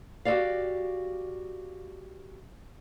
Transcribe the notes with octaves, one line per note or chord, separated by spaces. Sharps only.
F#4 G4 A4 B4 D5 F5